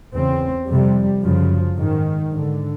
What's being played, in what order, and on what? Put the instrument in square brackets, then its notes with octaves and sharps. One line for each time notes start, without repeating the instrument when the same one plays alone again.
[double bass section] E2 C#3 C4
F2 C3 G3
F#2 C#3 F3
G#2 D#3
G#2 D3